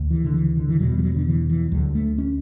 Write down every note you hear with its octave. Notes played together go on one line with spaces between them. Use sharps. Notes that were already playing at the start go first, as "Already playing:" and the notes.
Already playing: D2
E3
D3
E3
D3
E3
E2 B2 F#3
E3
G3
F#3
D3
E3
E3
D2 D3 F#3
A3
C#4